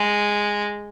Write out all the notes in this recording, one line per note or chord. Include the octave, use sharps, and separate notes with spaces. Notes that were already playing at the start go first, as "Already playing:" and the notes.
Already playing: G#3